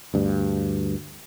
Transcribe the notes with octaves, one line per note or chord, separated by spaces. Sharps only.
D2 G2